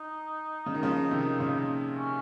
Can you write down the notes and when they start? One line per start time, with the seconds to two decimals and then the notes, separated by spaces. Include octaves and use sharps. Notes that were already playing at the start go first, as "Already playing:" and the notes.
Already playing: D#4
0.66 C#3
0.74 D#3
0.83 C#3 F3
1.11 C3 D#3
1.39 A#2 C#3
1.96 C#4